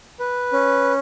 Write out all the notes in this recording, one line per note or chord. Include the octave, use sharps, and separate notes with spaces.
B4
C#4